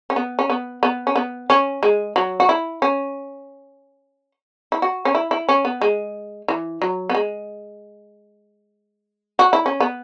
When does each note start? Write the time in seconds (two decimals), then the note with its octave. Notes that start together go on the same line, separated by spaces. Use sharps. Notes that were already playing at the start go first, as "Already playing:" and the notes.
0.10 C#4
0.16 B3
0.39 C#4
0.50 B3
0.83 B3
1.07 C#4
1.16 B3
1.50 C#4
1.83 G#3
2.16 F#3
2.40 F#4
2.49 E4
2.82 C#4
4.72 E4
4.82 F#4
5.05 C#4
5.15 E4
5.31 E4
5.49 C#4
5.65 B3
5.81 G#3
6.48 E3
6.82 F#3
7.09 B3
7.15 G#3
9.39 F#4
9.53 E4
9.66 C#4
9.80 B3